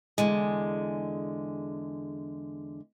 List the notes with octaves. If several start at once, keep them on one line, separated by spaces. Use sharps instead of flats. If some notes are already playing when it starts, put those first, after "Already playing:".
E2 D3 G#3